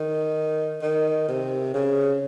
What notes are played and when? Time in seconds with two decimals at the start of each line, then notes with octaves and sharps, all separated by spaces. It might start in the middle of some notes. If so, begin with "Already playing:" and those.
Already playing: D#3
0.82 D#3
1.28 C3
1.74 C#3